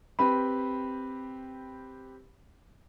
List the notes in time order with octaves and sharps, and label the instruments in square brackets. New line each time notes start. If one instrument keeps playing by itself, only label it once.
[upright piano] C4 G4 B4 [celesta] B5